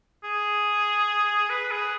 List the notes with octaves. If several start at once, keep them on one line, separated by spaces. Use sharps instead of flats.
G#4
B4
G#4